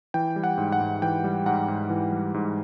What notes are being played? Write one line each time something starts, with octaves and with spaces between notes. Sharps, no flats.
E3 G5
G3
F#5
G#2
F#5
G#2
E3 G5
G3
G#2 F#5
G#2
E3
G3
G#2